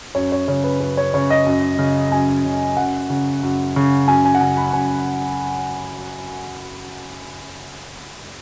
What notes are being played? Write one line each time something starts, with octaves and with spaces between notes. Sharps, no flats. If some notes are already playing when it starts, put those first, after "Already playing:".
F#2 C#5
C#5
C#3 C#5
B4
F#2 B4
C#5
C#3 C#5
D#5
F#2
C#3
F#2 G#5
C#3
F#2 F#5
C#3
F#2
C#3
F#2 G#5
G#5
F#5
C#3 G#5
B5
F#2 G#5